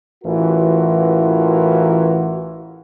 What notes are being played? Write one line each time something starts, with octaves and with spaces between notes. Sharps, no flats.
A1 E3 F4 F#4 A#4